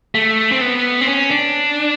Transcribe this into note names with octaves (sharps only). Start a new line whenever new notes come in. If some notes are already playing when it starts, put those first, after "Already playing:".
A3
C4
B3
C4
C#4
D4